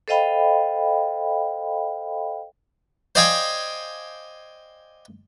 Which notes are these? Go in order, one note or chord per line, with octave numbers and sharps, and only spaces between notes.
A4 C5 D#5 F5 G5 B5
C5 D5 D#5 F5 G5 G#5